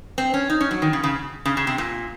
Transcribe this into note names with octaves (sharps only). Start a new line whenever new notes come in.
C4
C#4
D#4
C#4
F#3
D#3
C#3
C#3
C#3
C#3
C3
A#2